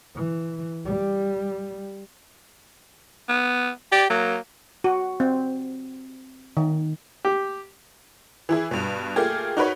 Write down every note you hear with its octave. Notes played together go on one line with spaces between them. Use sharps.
E3
G3
B3
G4 D5
F#3 A#3
F#4
C4
D#3
G4
E3 E4 G#4
G2 B2
A3 A#3 F4 G4 G#4
D#4 F#4 A#4 B4 C#5